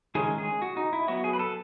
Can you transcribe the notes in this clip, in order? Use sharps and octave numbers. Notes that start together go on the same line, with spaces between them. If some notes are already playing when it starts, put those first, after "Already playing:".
D#3 G#3 C#4 G#4
G#4
F#4
D#4
E4
F#3 B3 F#4
G#4
B4
A4